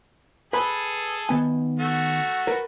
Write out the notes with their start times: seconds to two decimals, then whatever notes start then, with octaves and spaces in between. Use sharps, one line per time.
0.53 G#4 A4 B4 B5
1.29 D#3 B3 G#5
1.79 A3 F#4
2.47 A#4 B4